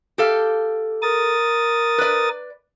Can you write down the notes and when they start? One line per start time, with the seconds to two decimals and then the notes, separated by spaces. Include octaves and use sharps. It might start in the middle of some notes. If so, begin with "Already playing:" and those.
0.18 G4 A4 F5
1.02 A#4 D#6 A6
1.98 B4 D5